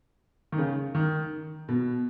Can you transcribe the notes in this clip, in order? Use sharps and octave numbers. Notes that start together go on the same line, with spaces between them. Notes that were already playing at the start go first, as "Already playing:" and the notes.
D#3
C#3
D#3
B2